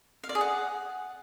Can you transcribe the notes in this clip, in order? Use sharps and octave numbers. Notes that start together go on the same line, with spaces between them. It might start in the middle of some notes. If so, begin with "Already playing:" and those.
F5
D5
G#4
F#5